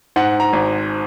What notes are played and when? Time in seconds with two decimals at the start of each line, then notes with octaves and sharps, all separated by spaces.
0.16 G#2 F#5
0.40 A#5
0.53 G#1